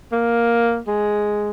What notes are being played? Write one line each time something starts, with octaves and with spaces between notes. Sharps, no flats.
A#3
G#3